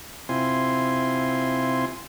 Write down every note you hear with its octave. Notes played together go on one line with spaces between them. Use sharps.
C3 C4 E4 F4 G#5 C6